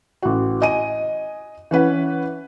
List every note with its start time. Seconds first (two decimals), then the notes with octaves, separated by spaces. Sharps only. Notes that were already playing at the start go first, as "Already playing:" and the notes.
0.22 A1 F#4
0.62 D#5 G#5 D#7
1.71 E3 C#4 B4 F#5